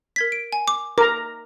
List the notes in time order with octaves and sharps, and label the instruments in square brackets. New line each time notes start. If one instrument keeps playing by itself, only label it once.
[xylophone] A#4 G#6 B6
D7
G#5
D6
[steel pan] A#4 A#5 [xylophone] D6